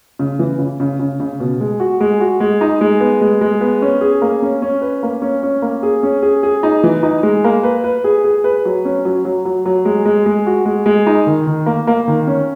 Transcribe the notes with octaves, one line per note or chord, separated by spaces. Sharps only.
C#3
E3
C#3
C#3
C#3
C#3
B2
G#3
F#4
G#3
F#4
G#3
D#4
G#3
B3
G#3
G#3
B3
C#4
G#4
A#3
C#4
C#4
B4
A#3
C#4
C#4
A#3
G#4
C#4
G#4
G#4
D#4
E3
D#4
G#3
A#3
B4
B4
G#4
G#4
B4
F#3
C#4
F#3
F#3
F#3
F#3
G#3
G#3
G#3
F#4
G#3
G#3
D#4
D#3
D#3
A#3
A#3
D#3
C#4